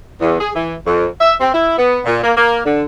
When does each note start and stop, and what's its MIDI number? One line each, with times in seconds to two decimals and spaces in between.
0.21 0.40 40
0.41 0.50 68
0.56 0.75 52
0.87 1.08 41
1.21 1.33 76
1.41 1.53 60
1.54 1.75 64
1.78 2.00 59
2.06 2.22 46
2.24 2.32 58
2.37 2.60 58
2.65 2.85 50